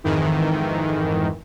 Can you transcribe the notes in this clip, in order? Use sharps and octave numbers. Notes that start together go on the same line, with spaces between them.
F2 G#2 D#3 E3